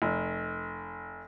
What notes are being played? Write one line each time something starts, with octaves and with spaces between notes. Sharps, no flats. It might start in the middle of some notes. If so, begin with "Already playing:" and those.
F1